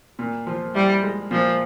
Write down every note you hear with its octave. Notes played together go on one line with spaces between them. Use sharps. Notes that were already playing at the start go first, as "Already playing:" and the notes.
A#2
F3
G3 E4
G#3
A#2 F3